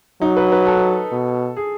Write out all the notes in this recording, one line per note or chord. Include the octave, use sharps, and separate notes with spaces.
F#3 D#4
B4
B4
A4
B2
G#4